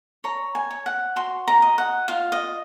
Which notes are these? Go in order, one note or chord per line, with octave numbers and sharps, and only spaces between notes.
C#5 A#5
G#5
C#5
F#5
F#4 C6
A#5
D#5
F#5
F4 F5
D#5